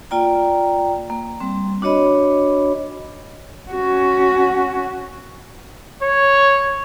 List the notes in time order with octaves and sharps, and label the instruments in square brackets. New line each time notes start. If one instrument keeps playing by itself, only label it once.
[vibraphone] A#3 F4 D5 G5 A#5
A#3
G3 C4
D4 F#4 C#5 D#5 B5
[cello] C#4 F#4
[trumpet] C#5